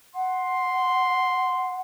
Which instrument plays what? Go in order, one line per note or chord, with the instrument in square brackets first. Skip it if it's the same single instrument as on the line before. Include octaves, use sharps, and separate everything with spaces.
[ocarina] F#5 [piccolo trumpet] C6